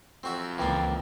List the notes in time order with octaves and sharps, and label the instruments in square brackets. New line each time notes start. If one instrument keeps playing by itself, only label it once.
[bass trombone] F2 [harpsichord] C4 F#4 E5
[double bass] C#2 [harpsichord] E3 A#3 D4 [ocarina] G5